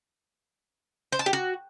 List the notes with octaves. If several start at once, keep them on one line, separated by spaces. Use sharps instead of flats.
C5
A5
G4
F#4